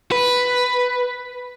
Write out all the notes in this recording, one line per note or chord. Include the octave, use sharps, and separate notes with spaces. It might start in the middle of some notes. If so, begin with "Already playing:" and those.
B4